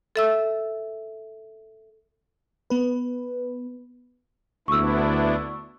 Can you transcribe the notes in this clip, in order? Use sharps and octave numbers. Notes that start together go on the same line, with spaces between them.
A4 E5 E6
B3 B4
D2 B3 D4 E4 C#6 E6